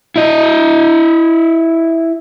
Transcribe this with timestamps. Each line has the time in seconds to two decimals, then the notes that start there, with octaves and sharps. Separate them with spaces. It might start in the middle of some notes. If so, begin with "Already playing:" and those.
0.16 E4 D#5